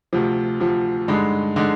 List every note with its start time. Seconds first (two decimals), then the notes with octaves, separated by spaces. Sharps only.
0.13 D2 C3 F3
0.60 D2 C3 F3
1.08 G2 D3 G#3 D#4
1.56 D3 G#3 D#4